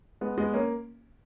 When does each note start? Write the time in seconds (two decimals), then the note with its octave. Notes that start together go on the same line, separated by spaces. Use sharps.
0.21 G#3 B3
0.38 G#3 B3
0.53 A#3 C#4